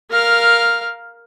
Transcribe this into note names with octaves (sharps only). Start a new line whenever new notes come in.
A#4 F5